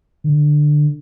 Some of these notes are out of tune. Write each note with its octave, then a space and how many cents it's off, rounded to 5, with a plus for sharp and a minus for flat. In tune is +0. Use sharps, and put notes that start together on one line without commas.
D3 +15